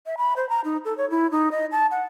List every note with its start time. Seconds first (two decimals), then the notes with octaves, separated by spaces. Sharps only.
0.06 E5
0.18 B5
0.36 C5
0.49 A#5
0.64 D#4
0.85 A4
0.98 C#5
1.10 E4
1.31 D#4
1.51 D#5
1.72 A5
1.91 F#5